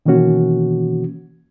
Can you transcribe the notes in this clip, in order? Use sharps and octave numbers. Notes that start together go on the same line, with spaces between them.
B2 D#3 E3 A#3 C#4 F#4